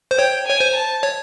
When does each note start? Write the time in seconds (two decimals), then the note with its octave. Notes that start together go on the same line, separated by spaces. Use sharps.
0.11 C5
0.18 C#5 G5
0.47 C#5 G#5
0.60 C5
0.75 A5
1.03 C#5